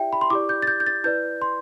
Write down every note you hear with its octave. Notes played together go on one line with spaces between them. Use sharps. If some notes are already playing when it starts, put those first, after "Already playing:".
Already playing: E4 G4 D5 E5 G5
B5
C6
E4 G4 D5 D6
G6
A6
G6
G6
A6
E4 B4 D5 G6
C6